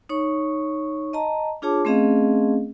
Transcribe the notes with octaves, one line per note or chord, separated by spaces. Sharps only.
D#4 C#5 C#6
D#5 A5 A#5
D4 F4 G#4 C#5 A5 D6
A3 C4 C#4 G#4 D#5 F5